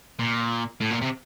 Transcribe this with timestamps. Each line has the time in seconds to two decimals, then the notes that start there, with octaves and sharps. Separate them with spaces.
0.19 A#2
0.81 A2
0.91 A#2
1.02 C3